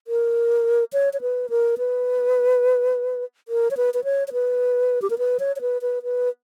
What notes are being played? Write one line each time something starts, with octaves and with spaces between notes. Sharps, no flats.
A#4
C#5
C#5
B4
A#4
B4
A#4
C#5
B4
B4
C#5
C#5
B4
G4
A#4
B4
C#5
C#5
B4
B4
B4